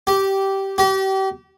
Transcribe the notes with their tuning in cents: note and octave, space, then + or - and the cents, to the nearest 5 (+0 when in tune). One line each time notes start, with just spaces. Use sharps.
G4 -15
G4 -35